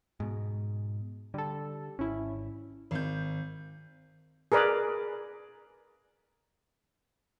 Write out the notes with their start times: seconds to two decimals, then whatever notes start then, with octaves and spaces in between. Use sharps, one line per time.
0.20 G#2 B2
1.34 D3 G3 A4
1.99 G#1 C#4 E4
2.91 G#1 G6
4.52 G#4 A#4 B4 D5